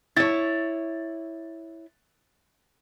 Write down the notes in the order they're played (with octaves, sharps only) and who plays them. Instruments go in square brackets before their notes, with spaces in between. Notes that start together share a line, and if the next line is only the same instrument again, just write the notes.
[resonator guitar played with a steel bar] E4 C#5 [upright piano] A6